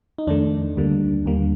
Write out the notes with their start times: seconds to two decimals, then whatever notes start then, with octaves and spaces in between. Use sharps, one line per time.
0.18 D#4
0.27 F2 D#3 A3 D4
0.77 D2 D3 G3 A#3
1.26 D#2 D3 G3 A#3